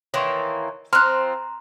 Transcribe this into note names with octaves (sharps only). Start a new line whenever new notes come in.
D#3 E3 A#3 C#5 C6 C#6
F3 C4 A#5 C6 F6 F#6